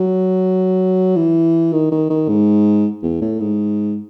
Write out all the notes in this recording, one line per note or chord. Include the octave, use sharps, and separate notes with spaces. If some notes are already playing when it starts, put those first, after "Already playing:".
Already playing: F#3
E3
D#3
D#3
D#3
G#2
E2
A2
G#2